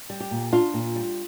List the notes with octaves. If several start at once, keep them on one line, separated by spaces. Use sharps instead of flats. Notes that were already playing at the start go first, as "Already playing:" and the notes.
G3
G4
A#2
D4 F4
A#2
G3